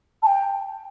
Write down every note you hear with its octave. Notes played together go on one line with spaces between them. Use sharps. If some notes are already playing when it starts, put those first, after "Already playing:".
A5
G5